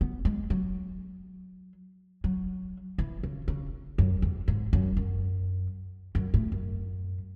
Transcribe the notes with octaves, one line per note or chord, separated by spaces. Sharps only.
B3
G#3
F#3
F#3
E3
C#3
C#3
F#2
E2
G#2
F#2
F#2
F#2
A2
F#2